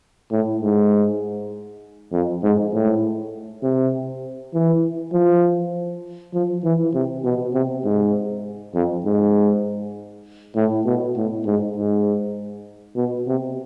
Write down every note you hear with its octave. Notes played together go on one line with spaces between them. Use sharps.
A2
G#2
F2
G#2
A2
C3
E3
F3
F3
E3
C3
B2
C3
G#2
F2
G#2
A2
B2
A2
G#2
G#2
B2
C3